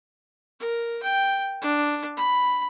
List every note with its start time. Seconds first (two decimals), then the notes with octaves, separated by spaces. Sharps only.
0.60 A#4
1.03 G5
1.62 D4
2.17 B5